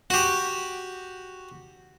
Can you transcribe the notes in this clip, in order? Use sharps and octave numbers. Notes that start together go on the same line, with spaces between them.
F#4 G4